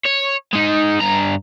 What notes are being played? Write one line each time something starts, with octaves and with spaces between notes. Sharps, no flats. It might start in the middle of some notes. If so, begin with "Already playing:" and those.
C#5
G#3 D#4
G2 A#5